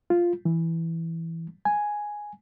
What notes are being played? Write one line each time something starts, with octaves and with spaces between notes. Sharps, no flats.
F4
E3
G#5